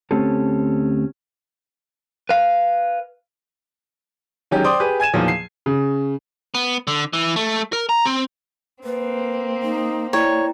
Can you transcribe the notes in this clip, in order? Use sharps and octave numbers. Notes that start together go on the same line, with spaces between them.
D2 A3 C4 C#4 G4 A4
B4 F5
D#3 F#3 G#3 C#4 G4
C5 D5 G5 C6 D6 D#6
G4 G#4 B4
G#5 G#6 D#7 E7
E2 A#2 D#3 F3 F#3
C7
C#3
B3
D3
E3
A3
A#4
A#5
C4
A#3 C4 B4
D#4
E4 C#5 D5 G5 A#5